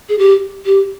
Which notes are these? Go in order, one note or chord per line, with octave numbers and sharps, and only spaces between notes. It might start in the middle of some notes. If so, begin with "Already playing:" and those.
G#4
G4
G4